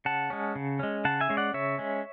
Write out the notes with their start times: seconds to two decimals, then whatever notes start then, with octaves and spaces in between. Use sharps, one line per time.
0.05 C#3 F#5 A5
0.30 G#3 C#4
0.55 C#3
0.79 G#3 C#4
1.05 C#3 F#5 A5
1.21 E5 G#5
1.29 G#3 C#4
1.37 D5 F#5
1.54 C#3 C#5 E5
1.78 G#3 C#4